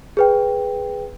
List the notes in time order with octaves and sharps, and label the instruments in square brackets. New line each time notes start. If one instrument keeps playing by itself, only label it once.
[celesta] G#4 B4 G5